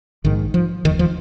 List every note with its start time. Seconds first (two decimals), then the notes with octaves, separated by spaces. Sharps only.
0.24 A#1 G#2 D#3
0.54 F3
0.85 F1 D#2 D#3
0.99 F3